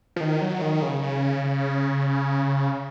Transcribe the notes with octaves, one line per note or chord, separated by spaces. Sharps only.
F3
D#3
F#3
D#3
C#3
C#3